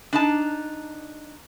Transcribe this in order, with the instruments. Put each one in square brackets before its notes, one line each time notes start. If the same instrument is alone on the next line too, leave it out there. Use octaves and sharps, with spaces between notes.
[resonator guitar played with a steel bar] D4 D#4 A5